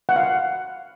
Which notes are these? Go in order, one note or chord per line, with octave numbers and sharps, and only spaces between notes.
F#5
F5
F#5